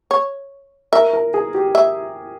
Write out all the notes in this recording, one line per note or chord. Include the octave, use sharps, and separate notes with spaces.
C#5
A#4 E5
A#4
G#4
G4
E5